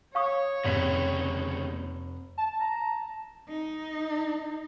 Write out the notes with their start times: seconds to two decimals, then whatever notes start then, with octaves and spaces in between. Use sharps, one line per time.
0.15 C#5 F5 C#6 D#6
0.64 F1 D#2 C#3 B6
2.38 A5
2.60 A#5
3.49 D#4